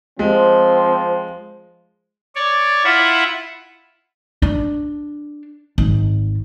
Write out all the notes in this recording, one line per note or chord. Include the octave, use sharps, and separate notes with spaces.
F3 G#3 C4
C#5 D5
E4 F4 E5 F#5
D4
G#1